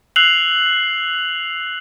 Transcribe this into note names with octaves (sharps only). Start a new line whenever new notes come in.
E6 F#6 C7 F7 F#7